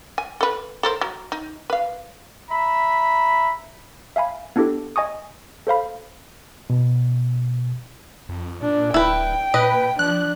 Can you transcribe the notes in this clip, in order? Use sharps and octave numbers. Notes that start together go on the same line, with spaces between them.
G#5
A4 B4
A4 A#4 C5
F#3
D#4
B4 F5
E5 A#5 B5
E5 F5 G#5 B5
B3 D4 E4 G4 A4
D#5 G#5 C#6 D#6
A4 C5 F5 B5
B2
F2
A#2 D4
D1 E4 B4 G5
A#2 B4 D#5
F3 D4 F#6